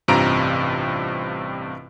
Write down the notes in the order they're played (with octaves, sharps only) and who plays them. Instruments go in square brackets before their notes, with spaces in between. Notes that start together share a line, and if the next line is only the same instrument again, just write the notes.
[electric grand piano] A1 G2 C3 F4 A#5 D7